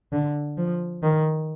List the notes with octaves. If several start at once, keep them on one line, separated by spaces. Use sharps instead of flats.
D3
F3
D#3